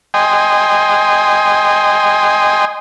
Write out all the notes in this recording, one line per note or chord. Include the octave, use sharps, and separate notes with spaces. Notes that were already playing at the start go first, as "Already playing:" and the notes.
D#5 G5 G#5 C6